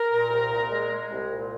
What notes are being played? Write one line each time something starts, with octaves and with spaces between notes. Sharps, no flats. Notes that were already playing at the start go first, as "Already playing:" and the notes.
Already playing: A#4
A#2
C2
A#2
G#3
G#3
C2
A#2